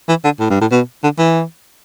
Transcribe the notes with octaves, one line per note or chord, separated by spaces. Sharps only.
E3
D3
A2
G2
A2
B2
D3
E3